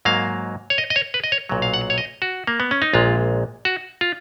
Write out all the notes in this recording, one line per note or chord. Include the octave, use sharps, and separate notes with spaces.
G#2 F#3 A#3 F5
C#5
D#5
D#5
C#5
B4
D#5
C#5
B1 A#2 F#3
F5
F#5
C#5
D#5
F#4
A#3
B3
C#4
D#4
A#1 A#2 G#3 F4
F#4
F4